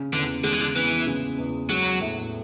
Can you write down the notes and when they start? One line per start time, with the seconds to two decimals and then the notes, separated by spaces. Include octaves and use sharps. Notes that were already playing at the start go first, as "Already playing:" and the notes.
Already playing: C#3
0.13 E2 D3
0.44 D3 G#3
0.53 E3
0.61 D3
0.76 E3 B3
1.07 C#3
1.38 E2
1.69 F#3 G#3
2.01 A2